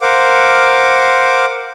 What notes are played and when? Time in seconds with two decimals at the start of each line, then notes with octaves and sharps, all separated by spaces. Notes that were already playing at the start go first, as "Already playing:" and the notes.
0.01 A#4 C5 F5 F#5 D6